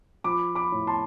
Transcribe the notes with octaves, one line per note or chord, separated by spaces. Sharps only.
F3 B5 D6
B5 D6
A2
A5 C6